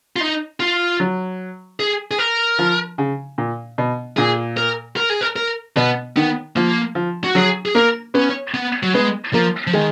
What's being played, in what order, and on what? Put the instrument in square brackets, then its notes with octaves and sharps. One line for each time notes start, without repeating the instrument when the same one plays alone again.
[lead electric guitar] F4
D#4
F4
[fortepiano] F#3
[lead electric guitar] G#4
G#4
A#4
[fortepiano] F3
C#3
A#2
B2
[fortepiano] A#2 [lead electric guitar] G#4
[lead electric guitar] A#4
A#4
G#4
A#4
A#4
[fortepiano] B2 [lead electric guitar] B3
[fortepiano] D#3 [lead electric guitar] B3
[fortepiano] F3 [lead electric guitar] A#3
[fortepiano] F3
[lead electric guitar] F#4
[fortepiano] F#3 [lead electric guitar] G#4
[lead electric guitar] G#4
[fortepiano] A#3 [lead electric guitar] A#4
[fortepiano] B3 [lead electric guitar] C#4
[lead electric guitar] B3
F#3
[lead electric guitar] G#3 [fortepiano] B3
[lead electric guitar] F3 [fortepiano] A#3
[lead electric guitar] F3
[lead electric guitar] D#3 [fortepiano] G#3